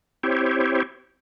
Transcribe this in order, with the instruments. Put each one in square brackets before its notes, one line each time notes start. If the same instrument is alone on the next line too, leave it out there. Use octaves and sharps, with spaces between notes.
[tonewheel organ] C4 E4 G4 C5 C#5